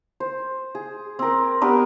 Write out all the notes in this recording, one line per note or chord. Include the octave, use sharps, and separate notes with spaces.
C5
G#4
C4 A#4
B3 D4 G4 A#4